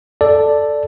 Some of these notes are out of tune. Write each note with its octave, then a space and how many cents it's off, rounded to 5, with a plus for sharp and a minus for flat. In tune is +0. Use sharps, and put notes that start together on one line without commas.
A4 +0 D5 +0